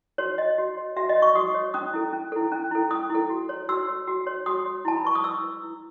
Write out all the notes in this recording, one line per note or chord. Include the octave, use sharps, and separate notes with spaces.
F#4 C#5
C#5 D#5
F#4
C#5
F#4 E5
D#5
C#5
C#6
F#4 D#6
C#5
C#4 D#6
E4 A4
C#4
E4 A4
C#4
E4 A4
C#4 D#6
E4 A4
F#4
C#5
F#4 E6
C#5
F#4
C#5
F#4 D#6
C#5
E4 A5
B5
B4 C#6
D#6
E4 E6
B4
E4